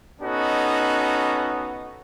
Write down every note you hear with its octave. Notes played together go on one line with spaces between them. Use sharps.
B3 C#4 D#4 F#4 A4